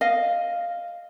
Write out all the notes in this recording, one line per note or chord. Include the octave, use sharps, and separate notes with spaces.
D#5 F5